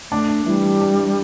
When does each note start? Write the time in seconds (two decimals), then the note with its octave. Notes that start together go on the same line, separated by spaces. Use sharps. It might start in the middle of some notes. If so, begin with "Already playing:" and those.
0.11 A3 D4
0.46 E3 G3
0.81 D4